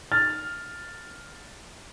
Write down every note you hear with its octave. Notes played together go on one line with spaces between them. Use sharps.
F6 A6